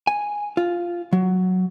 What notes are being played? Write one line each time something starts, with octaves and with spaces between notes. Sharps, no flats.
G#5
F4
F#3